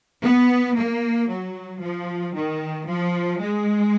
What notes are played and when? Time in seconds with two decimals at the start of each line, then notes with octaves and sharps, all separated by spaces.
0.23 B3
0.75 A#3
1.28 F#3
1.81 F3
2.34 D#3
2.88 F3
3.40 G#3